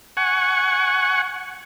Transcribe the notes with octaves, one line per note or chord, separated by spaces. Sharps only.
F#5 G#5 C#6